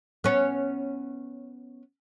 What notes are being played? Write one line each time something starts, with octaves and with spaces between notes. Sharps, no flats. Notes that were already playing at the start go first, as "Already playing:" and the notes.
B3 C#4